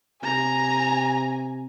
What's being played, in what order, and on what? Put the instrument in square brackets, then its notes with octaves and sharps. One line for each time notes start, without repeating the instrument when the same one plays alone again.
[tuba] C3 [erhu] G#5 [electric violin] A#5